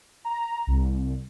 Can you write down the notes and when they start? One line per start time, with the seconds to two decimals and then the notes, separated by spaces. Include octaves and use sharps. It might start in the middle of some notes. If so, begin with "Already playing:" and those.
0.25 A#5
0.67 C2